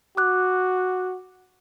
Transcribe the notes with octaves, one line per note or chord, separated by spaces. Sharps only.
F#4 D6 F#6